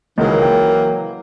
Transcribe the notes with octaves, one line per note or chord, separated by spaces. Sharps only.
C#2 D#3 E3 F#3 A#3 G#4
G5